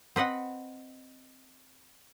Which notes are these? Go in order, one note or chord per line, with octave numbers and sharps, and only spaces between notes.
C4 B4 D#5 F#5